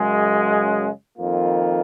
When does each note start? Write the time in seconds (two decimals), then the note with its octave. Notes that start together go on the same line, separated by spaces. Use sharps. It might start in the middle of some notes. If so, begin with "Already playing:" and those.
Already playing: F#2 C#3 G#3
1.17 F2 D#3 A#3 F4